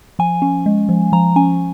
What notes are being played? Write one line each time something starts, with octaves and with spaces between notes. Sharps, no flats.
F3 G#5
C#4
G#3
F3
F3 A#5
C#4 G#5